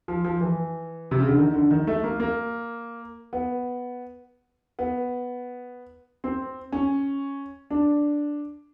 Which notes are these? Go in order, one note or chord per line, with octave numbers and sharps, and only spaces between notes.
F3
F3
E3
C3
C#3
D3
D#3
D3
D#3
A3
A#3
A#3
B3
B3
C4
C#4
D4